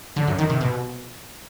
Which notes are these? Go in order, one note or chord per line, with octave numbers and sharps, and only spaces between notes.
D3
F#2
D#3
C3
B2